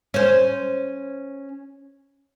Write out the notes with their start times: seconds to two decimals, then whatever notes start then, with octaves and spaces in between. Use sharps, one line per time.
0.14 C#4 C5